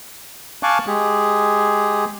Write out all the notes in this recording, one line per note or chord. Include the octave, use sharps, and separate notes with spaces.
F5 G#5 A5 C#6 D6 F#6
G#3 G4 G#4